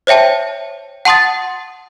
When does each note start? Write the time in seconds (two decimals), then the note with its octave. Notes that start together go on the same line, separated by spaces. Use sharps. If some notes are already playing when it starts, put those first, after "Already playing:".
0.07 C5 C#5 E5 G5 A5
1.05 F#5 A5 C6 D#6 A6